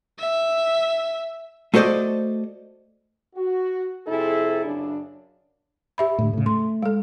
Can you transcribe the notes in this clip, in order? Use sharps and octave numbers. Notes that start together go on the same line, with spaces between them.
E5
A3 F#4 A4 C5 D5 D#5
F#4
F2 C3 E4 G#4 A4
F#2 C#3 D4
G4 E5 B5
A2 D3
A2 C#3
A3 C6
G#3 A4